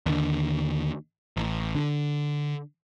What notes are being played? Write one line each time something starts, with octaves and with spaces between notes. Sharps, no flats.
D#2 D3
A1
D3